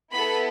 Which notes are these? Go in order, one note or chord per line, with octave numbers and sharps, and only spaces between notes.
B3 E4 A4 B5